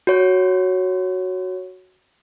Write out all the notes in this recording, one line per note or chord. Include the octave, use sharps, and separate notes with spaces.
F#4 C#5